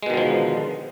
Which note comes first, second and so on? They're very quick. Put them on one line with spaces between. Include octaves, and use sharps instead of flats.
G#3 B2 D#3 D3 F3